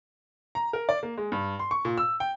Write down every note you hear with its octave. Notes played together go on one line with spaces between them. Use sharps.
A#5
A#4
D5
A#3
G#3
G2
C6
C#6
A#2
E6
G5